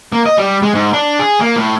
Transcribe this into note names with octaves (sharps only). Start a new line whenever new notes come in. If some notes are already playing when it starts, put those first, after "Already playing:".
A#3
D#5
G3
G#3
G#2
D4
G#4
A#3
A2